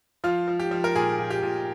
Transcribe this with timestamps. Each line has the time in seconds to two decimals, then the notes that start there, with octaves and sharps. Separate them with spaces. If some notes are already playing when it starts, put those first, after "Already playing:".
0.24 F3 F4
0.48 F3
0.60 G4
0.71 F3
0.84 A#4
0.96 A#2 G#4
1.19 A#2
1.30 G4
1.43 A#2